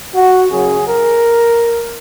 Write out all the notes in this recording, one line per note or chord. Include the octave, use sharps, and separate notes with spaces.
F#4
F#2 C#3 F#3 G#4
A#4